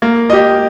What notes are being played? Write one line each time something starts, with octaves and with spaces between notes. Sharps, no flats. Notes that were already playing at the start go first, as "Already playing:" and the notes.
A#3
G4 D#5